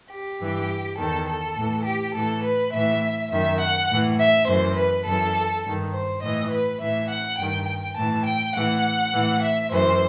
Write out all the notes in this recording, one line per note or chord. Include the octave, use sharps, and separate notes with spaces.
G4
G2 E3
E2 D#3 A4
A4
A2 E3
G4
A2 E3 A4
B4
A2 E3 E5
F#2 D#3 E5
F#5
A2 E3
E5
F#2 E3 C5
B4
F#2 E3 A4
G2 D#3
C5
A2 E3 D#5
B4
A2 E3 E5
F#5
G2 D#3 G5
G5
A2 E3 A5
G5
A2 E3 F#5
A2 E3
E5
F#2 E3 C5